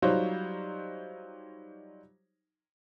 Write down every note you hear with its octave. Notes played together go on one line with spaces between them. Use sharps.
F#3 G3 D#4 F4 C5 C#5